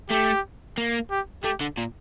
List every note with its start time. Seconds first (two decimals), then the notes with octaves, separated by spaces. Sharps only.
0.10 A3 G4
0.78 A#3
1.11 G4
1.44 A3 G4
1.61 D3
1.78 A#2